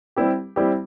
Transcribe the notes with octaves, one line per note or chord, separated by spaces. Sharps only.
G3 C4 E4 G4
G3 C4 E4 G4